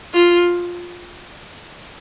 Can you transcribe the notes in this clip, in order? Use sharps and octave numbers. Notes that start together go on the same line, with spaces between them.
F4